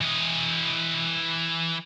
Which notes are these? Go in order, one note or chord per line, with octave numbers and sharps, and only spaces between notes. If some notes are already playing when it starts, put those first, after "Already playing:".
E3 D#5